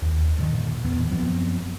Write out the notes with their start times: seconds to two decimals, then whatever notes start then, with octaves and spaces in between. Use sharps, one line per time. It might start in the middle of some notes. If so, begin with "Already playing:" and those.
0.02 D#2
0.38 G2 D3 D#3
0.51 A#2
0.85 D1 E2 E3 B3
1.11 F#2 F3 B3 C4